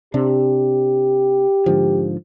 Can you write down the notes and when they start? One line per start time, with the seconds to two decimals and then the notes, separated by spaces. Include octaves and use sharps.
0.14 C3 D4 G4
1.66 G#2 D3 F3